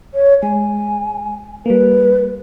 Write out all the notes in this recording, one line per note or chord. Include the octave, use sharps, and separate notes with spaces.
C#5
G#3 G#5
G3 A#3 B4